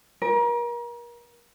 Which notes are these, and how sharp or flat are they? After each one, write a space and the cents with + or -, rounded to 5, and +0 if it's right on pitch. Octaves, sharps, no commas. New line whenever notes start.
A#4 +35